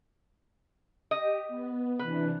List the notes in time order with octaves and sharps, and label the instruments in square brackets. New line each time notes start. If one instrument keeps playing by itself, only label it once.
[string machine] G4 [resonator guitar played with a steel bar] D#5
[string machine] B3
[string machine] C3 E3 D4 [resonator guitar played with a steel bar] B4